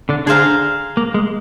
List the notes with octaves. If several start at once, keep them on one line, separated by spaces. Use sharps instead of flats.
D3 D4
D3 D4 G#4 C5 F5 A#5
A#3
G#3